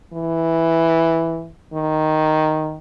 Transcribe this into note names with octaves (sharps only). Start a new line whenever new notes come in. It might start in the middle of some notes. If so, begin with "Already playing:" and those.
E3
D#3